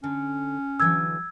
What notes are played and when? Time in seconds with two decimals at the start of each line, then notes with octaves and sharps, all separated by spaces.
0.04 D3 C#4
0.80 D3 E3 F#3 E6 G#6